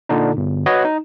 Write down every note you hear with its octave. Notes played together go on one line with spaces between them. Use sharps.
A#2 D3 D4 D#4
G1
F#4 B4 C#5 D#5 F#5
D#4